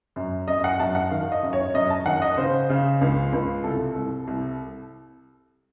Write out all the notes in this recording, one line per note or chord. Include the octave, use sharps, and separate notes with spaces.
F#2
F#2 D#5
F#5
F#2 A5
F#5
D#3 F5
D#5
F#2
C#5
F#2 D#5
A5
D#3 F#5
D#5
C#3 C5
C#3
C#2
C#2
C2 A4
C2
C2